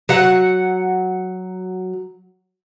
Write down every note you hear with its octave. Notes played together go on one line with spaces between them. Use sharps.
F#3 F#5